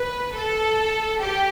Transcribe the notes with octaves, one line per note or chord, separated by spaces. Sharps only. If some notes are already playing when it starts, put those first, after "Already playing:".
Already playing: B4
A4
G4